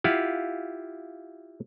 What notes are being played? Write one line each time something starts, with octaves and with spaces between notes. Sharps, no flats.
E4 F4 G4 F5 F#5